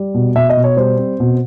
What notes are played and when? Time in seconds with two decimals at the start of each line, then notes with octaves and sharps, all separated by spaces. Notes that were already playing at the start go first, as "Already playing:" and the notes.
Already playing: G3
0.14 B2
0.35 B2 E5
0.49 D#5
0.57 B2
0.64 C#5
0.77 G3 C5
0.98 C4
1.20 B2